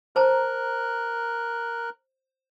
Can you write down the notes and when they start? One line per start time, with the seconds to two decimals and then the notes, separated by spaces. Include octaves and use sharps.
0.16 A#4 C5 A5 A#5 F#6